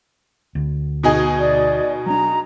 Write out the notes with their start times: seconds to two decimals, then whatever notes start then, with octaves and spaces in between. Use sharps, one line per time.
0.55 D2
1.03 B2 D#4 G#4
1.40 D5
2.06 F#3 D4 A#5